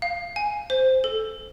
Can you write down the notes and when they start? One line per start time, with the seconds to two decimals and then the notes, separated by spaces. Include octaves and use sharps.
0.02 F5
0.36 G#5
0.70 C5
1.04 A4